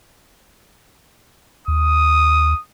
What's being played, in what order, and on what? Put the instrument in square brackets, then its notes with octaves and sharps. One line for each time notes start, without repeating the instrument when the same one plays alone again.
[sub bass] D#2 [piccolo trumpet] D#6